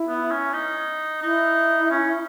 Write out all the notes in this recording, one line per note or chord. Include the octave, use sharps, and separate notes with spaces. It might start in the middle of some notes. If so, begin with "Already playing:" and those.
Already playing: E4
B3
C#4
D#4
D#4 E4
C#4